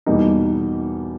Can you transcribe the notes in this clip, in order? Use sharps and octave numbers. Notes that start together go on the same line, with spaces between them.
E2 B2 G3 A#3 D#4